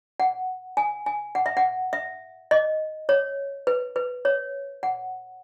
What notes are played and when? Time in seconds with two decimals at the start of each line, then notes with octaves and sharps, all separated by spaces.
0.20 F#5
0.77 G#5
1.06 G#5
1.35 F#5
1.46 E5
1.57 F#5
1.93 E5
2.51 D#5
3.09 C#5
3.67 B4
3.96 B4
4.25 C#5
4.83 F#5